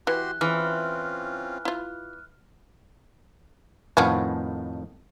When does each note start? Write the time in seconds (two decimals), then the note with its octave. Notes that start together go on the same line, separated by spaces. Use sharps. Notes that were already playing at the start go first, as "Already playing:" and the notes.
0.07 E3 F#4 G4 C6 F#6
0.41 E3 C4 C#4 F4 G#4 F6
1.65 E4 F4
3.97 F2 A2 D#3 F3 B3 C#4